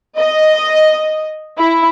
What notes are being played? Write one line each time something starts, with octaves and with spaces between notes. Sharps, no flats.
D#5
E4